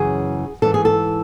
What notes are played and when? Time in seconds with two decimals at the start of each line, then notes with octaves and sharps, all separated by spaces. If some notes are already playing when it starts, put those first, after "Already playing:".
Already playing: F#2 C#3 E3 G#4
0.62 G#2 E3 A4
0.74 G#4
0.85 A4